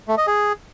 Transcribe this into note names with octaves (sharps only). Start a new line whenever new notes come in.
A3
D#5
G#4